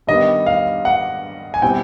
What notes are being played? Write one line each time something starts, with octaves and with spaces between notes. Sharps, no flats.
G2 D#3 G3 B3 D#5
F5
F#5
G#5
B2 G3 C4 E4 G5